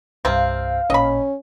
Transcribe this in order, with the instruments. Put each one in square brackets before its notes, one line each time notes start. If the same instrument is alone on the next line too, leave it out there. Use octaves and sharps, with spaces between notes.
[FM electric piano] C2 G2 [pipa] C3 C4 [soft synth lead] F5
[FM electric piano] A1 A#2 [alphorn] C#4 [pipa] D#5 B5